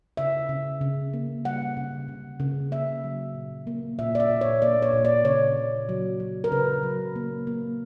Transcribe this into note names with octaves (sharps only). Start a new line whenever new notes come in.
C#3 E5
C#3
C#3
A#3
G3 F#5
C#3
C#3
C#3
A#3 E5
F#3
A#2
A#3
A#2 E5
D5
E5
A#2
C#5
A#3 D5
C#5
A#2
D5
C#3 C#5
C#3
F#3
F#3
A#4
C#3 B4
F#3
A#3
A#3